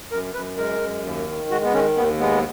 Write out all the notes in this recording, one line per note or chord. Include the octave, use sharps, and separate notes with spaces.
F#2 A#4
F#2 B4
G#3 A#4
F#2
D#2
D#3
G#3 F#4
B3
D#3 C#4
D#2 B3
G#3 B3